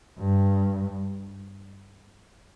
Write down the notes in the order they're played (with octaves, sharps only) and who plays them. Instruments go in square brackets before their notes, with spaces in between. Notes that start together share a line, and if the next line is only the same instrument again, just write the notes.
[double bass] G2